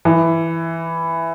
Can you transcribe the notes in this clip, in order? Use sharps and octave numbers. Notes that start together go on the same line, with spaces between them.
E3